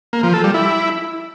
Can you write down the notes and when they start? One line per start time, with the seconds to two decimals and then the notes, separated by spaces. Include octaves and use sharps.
0.13 A#3
0.23 F3
0.34 A4
0.44 G3
0.54 E4